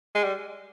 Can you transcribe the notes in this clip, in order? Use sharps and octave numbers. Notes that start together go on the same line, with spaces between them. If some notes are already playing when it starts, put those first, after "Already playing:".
G#3
G3